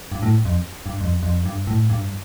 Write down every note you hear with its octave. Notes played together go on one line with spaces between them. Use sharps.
G2
A2
F2
G2
F2
F2
G2
A2
G2